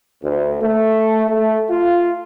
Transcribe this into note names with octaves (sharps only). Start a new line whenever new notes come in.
D2
A3
A3
F4